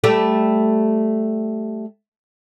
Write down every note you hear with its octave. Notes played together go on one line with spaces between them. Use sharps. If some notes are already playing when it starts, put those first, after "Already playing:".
G3 A3 G4